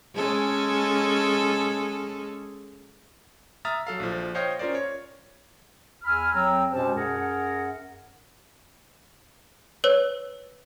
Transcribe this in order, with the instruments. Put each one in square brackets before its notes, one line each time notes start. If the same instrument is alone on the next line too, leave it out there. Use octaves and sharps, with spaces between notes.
[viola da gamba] G#3 C#4 A4
[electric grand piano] E5 A#5 D#6 F6 A6
F#3 A4 F5
A#1 F3
C5 C#5 D#5 F5 G5 G6
C#4 F4 A#4 C5 D5
C#5
[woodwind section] E2 G#5 B5 E6 F6
F2 F#3 C4 G5 A#5 E6
B2 G#3 C#4 G4 C5 A5
F#2 G#4 A#4 F#5
[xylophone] B4 C#5